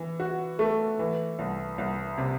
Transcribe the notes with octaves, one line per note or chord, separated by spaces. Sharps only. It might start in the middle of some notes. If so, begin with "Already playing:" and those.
Already playing: E3
F#4
A3
E3
C2
C2
C3